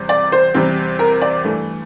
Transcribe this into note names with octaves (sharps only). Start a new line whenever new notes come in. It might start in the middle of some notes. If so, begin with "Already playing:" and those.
Already playing: E2 C3 G3 C4
D5
C5
E2 C3 G3 C4
A#4
D5
G2 E3 A3